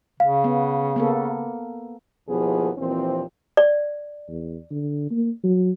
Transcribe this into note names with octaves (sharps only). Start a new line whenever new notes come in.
C#3 F5
B3
A#3 B3 A4
D#2 B2 F3 B3 E4 G#4
D#2 A#2 E3 F3 C4
D5
E2
D3
A#3
F#3